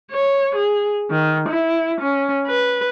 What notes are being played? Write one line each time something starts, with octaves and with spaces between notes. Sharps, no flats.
C#5
G#4
D#3
E4
C#4
B4